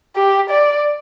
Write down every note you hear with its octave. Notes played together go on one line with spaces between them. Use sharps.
G4
D5